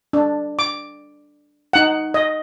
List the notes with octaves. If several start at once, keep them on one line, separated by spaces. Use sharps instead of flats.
D4
D6
D#4 F#5
D#5